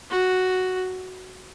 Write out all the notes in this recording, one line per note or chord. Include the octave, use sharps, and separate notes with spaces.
F#4